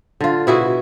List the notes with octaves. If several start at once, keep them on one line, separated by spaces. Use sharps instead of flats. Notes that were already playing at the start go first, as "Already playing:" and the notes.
D3 F4
B2 E4 F#4 G#4